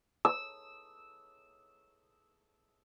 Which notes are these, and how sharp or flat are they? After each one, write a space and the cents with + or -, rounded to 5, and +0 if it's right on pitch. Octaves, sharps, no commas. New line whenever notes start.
E6 -10